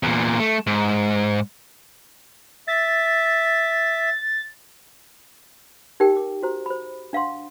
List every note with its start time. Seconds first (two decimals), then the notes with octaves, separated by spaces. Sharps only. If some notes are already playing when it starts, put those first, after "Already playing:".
0.03 E2 A#2
0.39 A3
0.67 G#2
2.68 E5 A6
6.00 D#4 G4 A#4 G5
6.17 D6
6.43 F#4 C5 A#5
6.66 C5 B5
7.13 D4 F5 F#5 C6